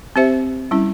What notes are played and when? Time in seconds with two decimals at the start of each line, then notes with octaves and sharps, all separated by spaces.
0.16 C4 G4 C5 E5
0.71 G3 C#4 E4